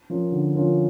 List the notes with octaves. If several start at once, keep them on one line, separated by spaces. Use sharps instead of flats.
F3 C#4 F4 A#4
D3
F3 C#4 F4 A#4